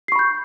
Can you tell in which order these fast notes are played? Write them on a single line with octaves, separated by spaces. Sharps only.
C7 C#6 B5 G6